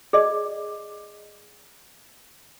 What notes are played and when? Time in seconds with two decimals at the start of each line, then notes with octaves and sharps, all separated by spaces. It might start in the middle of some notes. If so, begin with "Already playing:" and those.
0.13 G#4 D5 D#5